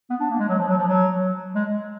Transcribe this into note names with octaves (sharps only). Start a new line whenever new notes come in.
B3
D4
A#3
G#3
F#3
F3
F#3
F3
F#3
G#3